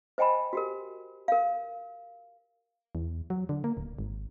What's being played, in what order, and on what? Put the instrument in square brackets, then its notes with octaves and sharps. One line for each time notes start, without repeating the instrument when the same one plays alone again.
[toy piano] C5 D#5 G5 G#5 B5
F#4 G4 A#4
A#4 F5
[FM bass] E2
F#3
D3
A#3
D1
G#1